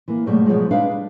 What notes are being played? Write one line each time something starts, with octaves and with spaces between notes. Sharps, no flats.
E3 A#3
G#2 B2 F#3 G3 A3 A#3
G#2 B2 D3 F3 F#3 G#3
G#3 D4 D#4 B4 F5
G3